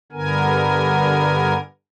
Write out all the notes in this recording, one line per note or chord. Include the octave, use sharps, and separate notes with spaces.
G2 D3 B3 A#4 G#5